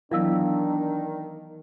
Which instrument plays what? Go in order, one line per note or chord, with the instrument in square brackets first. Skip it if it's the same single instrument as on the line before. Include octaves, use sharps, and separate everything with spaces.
[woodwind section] D#3 [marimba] E3 F#3 B3 [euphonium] D4 [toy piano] E4 F5 E6